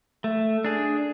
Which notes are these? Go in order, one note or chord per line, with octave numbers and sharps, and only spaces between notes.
A3
D4 G#4